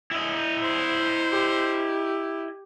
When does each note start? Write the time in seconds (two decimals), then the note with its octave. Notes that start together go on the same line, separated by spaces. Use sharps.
0.11 E4 D#5
0.64 C5
1.32 G4